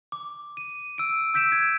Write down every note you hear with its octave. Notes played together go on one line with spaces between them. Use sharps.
D6
D#7
E6 D7
E6 G6 B6 D7 E7
G#6